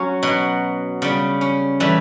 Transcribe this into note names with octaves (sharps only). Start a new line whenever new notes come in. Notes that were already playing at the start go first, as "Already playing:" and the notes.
Already playing: F#3 C#4 F#4
B2 F#3
C#3 G3
C#4
A2 E3 G3